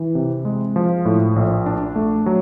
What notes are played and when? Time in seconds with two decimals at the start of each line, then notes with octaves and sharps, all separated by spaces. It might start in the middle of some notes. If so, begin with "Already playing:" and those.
Already playing: E3
0.15 C3
0.45 G#3
0.76 F3
1.05 A2
1.36 A#1
1.66 D4
1.96 A3
2.26 F#3